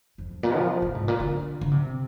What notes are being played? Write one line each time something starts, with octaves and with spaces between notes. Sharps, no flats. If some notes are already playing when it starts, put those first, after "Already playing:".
F2
G2
A#2
F3
C3
G#2
A#2
D3
D3
C3